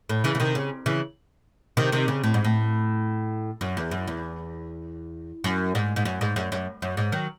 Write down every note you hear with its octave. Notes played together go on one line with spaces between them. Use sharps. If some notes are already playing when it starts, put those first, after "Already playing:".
A2
C#3 E3
C#3
C3 D#3
C#3
C#3 E3
C3 D#3
C3 D#3
C#3
A2
G#2
A2
F#2
E2
F#2
E2
F#2
G#2
G#2
F#2
G#2
F#2
F#2
F#2
G#2
D#3 F#3